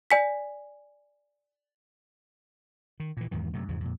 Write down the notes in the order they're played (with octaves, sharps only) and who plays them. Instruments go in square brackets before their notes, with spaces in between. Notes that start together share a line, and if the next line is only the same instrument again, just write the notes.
[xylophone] D5 G#5 B6
[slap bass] D#3
A#2 E3
E2 G#2 D#3 E3
F#2 C3 A3
E2 G#2 C#3 F3
F2 A#2